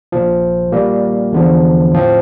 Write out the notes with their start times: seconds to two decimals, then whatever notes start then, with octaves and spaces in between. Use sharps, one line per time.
0.12 A#1 A#2 F3
0.72 A#2 G3 A#3
1.33 E2 D3 F3
1.92 A2 F3 C4